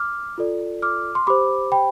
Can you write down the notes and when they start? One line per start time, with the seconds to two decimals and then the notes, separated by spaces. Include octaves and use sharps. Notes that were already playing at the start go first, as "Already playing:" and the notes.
Already playing: D6 F6
0.38 F4 A4 D5
0.82 D6 F6
1.15 C6
1.27 G4 C5 B5 D6
1.72 G5 B5